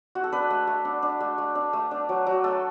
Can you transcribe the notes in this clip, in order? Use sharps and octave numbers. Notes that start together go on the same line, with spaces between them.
F#4
A4
D4 B4
A3
A3
D4
D4
A3
A3
D4
A3
D4
F#3
F#3
A3 A4